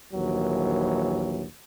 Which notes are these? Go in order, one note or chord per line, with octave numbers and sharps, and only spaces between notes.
A#1 D#2 E3 F#3